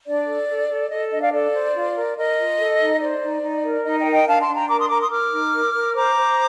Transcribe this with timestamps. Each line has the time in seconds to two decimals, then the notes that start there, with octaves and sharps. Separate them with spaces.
0.06 D4 D5
0.27 A4
0.49 A4
0.70 A4
0.90 A4 D#5
1.11 D4 D#5
1.21 D5 F5
1.33 A4 D5
1.53 C5
1.75 F4
1.95 A#4
2.16 A#4 D#5
2.38 F4
2.58 A4
2.79 D#4
3.00 C5 D5
3.21 D#4
3.42 D#4
3.64 A#4
3.84 D#4 D#5
3.98 D#5 G5
4.05 A#4
4.12 D#5 G5
4.26 D4 F5 A5
4.40 A5 C6
4.47 D4
4.54 G5 A#5
4.68 A#4 A#5 D6
4.79 C6 D#6
4.89 A#4 A#5 D6
4.99 C6 D#6
5.10 A#4 D6 F6
5.31 D#4
5.52 A#4
5.73 A#4
5.94 C5 A#5 D6
6.16 C5